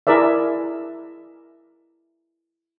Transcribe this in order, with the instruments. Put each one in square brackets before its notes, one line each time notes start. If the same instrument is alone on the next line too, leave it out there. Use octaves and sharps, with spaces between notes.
[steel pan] E4 G#4 A#4 D5 E5